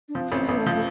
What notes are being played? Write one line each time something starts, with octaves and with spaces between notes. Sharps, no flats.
D4
F3 C4
A1 C4
A1 B3
A3
F3
A3